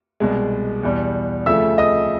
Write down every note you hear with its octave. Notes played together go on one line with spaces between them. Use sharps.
C2 B2 G#3
E2 B2 G3
D2 C#3 F3 A3 E5 E6
D#5 D#6